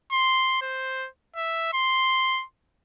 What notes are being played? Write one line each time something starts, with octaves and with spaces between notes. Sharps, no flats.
C6
C5
E5
C6